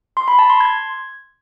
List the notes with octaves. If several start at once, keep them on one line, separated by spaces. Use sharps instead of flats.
C6
B5
A5
C6
G#6